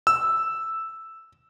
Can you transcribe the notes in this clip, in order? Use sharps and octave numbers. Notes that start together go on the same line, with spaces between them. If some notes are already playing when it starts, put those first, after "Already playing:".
E6